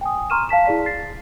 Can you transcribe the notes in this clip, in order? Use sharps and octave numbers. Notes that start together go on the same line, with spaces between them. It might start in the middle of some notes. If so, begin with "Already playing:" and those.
G5 G#5 D#6
A#5 C6 C#6 F6 D#7 E7
F5 A5 B6 E7
E4 G#4 D5 B6
A6 C7